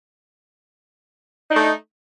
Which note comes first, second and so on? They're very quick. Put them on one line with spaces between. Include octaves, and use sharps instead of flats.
D#4 D4 A3